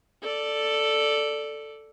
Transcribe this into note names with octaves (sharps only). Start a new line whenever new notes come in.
A4 D5